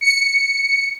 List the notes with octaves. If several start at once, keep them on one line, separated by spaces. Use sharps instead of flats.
C#7